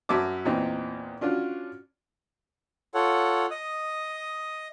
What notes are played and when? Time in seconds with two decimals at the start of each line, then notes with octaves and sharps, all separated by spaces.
0.09 F#2 E5 A5 D6
0.45 E2 A#2 C4 D#4
1.21 C#4 D4 F4 F#4
2.95 F4 A4 C#5 F#5
3.51 D#5 D#6